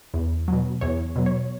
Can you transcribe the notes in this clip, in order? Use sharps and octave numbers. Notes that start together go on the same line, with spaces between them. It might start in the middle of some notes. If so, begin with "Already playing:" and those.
E2
B2 F#3
E2 C#5
B2 F#3
C#5